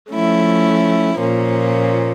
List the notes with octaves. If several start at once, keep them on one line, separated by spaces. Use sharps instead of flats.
F3 A3 C#4 E4
A#2 F3 A#3 C#4